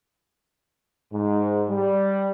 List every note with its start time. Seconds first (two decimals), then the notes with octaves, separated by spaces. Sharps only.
1.12 G#2
1.69 G3